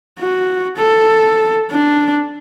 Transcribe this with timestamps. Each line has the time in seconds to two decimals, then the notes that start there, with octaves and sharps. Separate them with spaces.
0.19 F#4
0.76 A4
1.71 D4